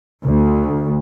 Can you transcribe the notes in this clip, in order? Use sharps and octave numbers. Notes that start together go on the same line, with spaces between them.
D2